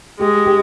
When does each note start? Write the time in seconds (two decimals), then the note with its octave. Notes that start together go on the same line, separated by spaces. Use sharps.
0.20 G#3 G4
0.46 G4